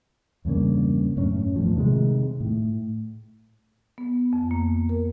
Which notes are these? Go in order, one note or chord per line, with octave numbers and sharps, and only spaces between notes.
E2 G2 C#3 A#3
F#2 A2 C#4
E2 A2 F3
C3 D#3 F3 G#3
A2
B3
F2
A#3
A#4